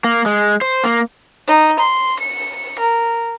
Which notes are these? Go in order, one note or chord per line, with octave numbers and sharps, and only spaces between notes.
A#3
G#3
C5
A#3
D#4
C6
C#7
A#4